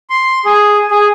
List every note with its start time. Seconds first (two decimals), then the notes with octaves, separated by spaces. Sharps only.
0.10 C6
0.45 G#4
0.91 G#4